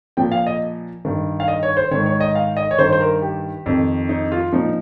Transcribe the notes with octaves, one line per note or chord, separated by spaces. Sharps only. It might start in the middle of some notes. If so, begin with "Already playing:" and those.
A#2 F3 G5
F5
D#5
G2 D#3
F5
D#5
C#5
C5
G#2 D#3 C#5
C#5
D#5
F5
D#5
C#5
G2 D#3 C5
C5
A#4
G4
F2 D#3
D#4
F4
A#2 F3 D#4